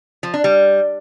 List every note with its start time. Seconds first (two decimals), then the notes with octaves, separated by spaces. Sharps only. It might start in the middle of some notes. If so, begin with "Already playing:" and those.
0.23 F3
0.34 D4
0.44 G3